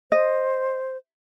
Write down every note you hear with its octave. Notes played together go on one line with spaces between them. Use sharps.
C5 D#5